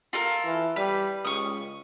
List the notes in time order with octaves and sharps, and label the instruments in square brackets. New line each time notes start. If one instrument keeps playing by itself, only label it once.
[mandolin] F4 A4 A#4
[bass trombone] E3
[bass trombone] G3 [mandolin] B4
[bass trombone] C#2 [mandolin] C#6 D#6